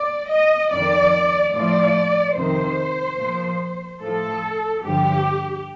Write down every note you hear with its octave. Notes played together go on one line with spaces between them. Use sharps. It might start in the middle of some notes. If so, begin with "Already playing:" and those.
Already playing: D5
D#5
F2 D#3 D5
A2 F3 D5
F2 C3 D#3 C5
A#2 F3
A2 F3 A4
G2 D3 F3 G4